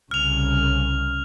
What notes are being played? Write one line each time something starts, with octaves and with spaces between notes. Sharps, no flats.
C2 C#3 F6 F7